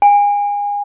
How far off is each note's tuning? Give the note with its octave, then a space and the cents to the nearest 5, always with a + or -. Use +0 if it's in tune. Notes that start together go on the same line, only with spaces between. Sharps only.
G#5 -30